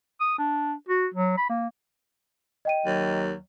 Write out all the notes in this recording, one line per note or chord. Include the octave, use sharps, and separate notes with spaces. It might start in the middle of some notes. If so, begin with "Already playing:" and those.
D#6
D4
F#4
F#3
B5
A#3
D#5 G5 D#7
D#2 F#3